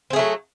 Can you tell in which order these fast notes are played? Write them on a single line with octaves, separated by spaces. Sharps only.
C4 G#4 A3 F#3